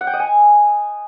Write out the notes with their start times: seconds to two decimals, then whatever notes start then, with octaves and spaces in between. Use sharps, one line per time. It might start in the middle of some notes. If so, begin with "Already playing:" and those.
0.01 F#5
0.07 G5
0.13 D#5
0.20 G#5